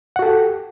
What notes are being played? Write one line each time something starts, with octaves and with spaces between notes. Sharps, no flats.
F#4 G4 A4 F#5